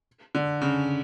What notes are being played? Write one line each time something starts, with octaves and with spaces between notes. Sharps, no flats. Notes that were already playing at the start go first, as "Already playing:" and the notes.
D3
C#3